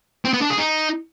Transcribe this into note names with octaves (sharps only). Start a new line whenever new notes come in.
C4
B3
D4
G#4
D#4